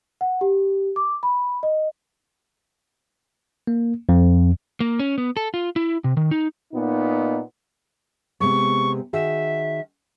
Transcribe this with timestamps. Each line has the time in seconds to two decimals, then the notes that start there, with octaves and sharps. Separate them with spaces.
0.21 F#5
0.41 G4
0.96 D6
1.23 B5
1.63 D#5
3.67 A#3
4.09 F2
4.80 A#3
4.99 C#4
5.18 B3
5.37 A4
5.54 F4
5.76 E4
6.04 C3
6.17 D#3
6.31 D#4
6.73 A#2 B3 D#4
8.40 C3 G#3 B3 C#6
9.13 D#3 F#4 G#4 E5